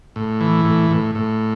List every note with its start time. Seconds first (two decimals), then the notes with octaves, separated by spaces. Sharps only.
0.16 A2
0.41 E3
0.65 A2
0.91 A2
1.15 A2